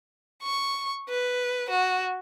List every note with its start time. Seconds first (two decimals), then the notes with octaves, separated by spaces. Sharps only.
0.43 C#6
1.09 B4
1.70 F#4